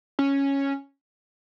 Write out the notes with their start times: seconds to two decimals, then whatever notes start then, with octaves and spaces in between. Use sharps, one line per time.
0.19 C#4